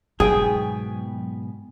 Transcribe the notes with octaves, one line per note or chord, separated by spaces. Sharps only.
G#2 B2 F#3 B3 G#4 G5 G#5